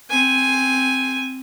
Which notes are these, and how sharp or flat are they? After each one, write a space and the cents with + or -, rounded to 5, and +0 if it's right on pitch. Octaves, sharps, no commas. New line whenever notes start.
C4 +0 G#5 +0